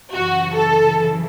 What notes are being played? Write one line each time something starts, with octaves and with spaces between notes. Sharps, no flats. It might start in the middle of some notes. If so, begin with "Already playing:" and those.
F#2 C#3 E3 F#4
A4